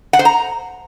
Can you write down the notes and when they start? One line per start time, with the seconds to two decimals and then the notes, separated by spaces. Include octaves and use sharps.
0.13 F#5
0.19 C5
0.25 A#5